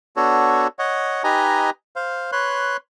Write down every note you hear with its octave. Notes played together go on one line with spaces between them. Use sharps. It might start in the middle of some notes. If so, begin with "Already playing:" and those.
B3 D4 F#4 A4 C#5
C#5 D#5 F#5
D#4 G4 B4 D#5 G#5 A#5
C5 F5
B4 C#5 C6 F#6